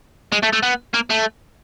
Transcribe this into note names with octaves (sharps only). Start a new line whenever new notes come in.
G#3
A3
A3
B3
A#3
A3